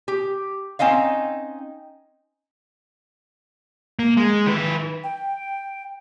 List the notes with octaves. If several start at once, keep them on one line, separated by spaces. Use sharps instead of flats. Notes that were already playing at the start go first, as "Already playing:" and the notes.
G4
C4 C#4 D#4 D#5 F5
A#3
G#3
D#3 B4
G5